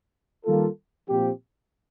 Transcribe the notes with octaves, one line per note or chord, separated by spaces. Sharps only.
D#3 G3 A#3 F4 A4
A#2 F3 C4 G4